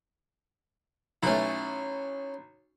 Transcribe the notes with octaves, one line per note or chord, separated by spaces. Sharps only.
B1 A3 C#4 E4